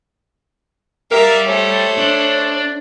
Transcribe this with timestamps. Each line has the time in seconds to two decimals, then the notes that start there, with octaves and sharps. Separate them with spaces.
1.11 G4 A#4 D5 E5 F5
1.47 A3 C5 C#5
1.98 D4